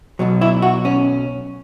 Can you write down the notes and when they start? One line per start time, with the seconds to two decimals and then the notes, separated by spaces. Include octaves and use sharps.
0.19 B1 B2 F#3
0.41 E4
0.62 F#4
0.85 C#4